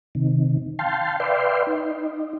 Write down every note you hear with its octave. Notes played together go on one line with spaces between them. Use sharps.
C3 D#3
F5 G5 A5 C6
B4 D5 E5 F5 G5 C6
D#4